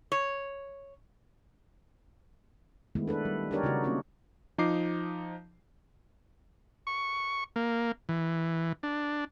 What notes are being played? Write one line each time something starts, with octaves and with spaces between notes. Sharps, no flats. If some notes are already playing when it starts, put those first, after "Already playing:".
C#5
D#3 G#3 A3 B3 E4
D4 A4 B4
G3
D4 D#4 G4 A#4 C#5 D5
C#3 D#4 F#4
A#3 C4 C#4 D#4 F4
F3 D#4 A#5 D6 C7
C#6
A#3
E3
D4